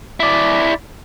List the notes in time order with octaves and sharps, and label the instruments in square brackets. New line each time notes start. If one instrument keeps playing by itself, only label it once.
[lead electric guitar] E4 D5